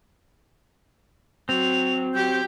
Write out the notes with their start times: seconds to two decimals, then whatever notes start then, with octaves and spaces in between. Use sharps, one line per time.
1.49 F#3 C4 F7
2.14 F#3 G4 G6